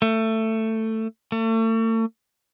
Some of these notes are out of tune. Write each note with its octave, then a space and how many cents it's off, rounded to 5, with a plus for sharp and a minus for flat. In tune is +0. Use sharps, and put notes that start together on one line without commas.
A3 +15
A3 +40